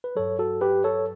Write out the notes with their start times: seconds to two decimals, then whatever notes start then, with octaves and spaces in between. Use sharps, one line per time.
0.04 B4
0.15 G2 F#3 A4 C#5
0.39 F#4 A4
0.61 G4 B4
0.84 A4 C#5